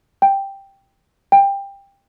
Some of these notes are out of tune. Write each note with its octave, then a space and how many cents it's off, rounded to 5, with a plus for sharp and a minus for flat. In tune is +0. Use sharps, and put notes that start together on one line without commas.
G5 +5
G5 +20